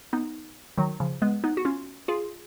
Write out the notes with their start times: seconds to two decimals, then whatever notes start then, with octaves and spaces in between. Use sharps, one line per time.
0.13 B3 D#4
0.78 D#3 F#3
1.00 C#3 F3
1.22 G#3 B3
1.44 B3 D#4
1.57 F#4
1.65 C#4 F4
2.08 F4 G#4